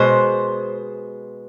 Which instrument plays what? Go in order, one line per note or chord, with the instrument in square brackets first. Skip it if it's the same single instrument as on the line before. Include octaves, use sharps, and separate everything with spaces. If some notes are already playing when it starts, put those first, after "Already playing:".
Already playing: [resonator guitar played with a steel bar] B2 G#3 C5